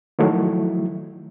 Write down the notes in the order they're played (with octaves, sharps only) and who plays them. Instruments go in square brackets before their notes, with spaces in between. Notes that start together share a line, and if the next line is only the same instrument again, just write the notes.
[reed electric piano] D#3 F3 F#3 A3 E4